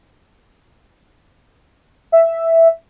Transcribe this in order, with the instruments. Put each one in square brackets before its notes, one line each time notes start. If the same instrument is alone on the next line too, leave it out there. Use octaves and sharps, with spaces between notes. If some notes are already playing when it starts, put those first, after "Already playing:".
[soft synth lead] E5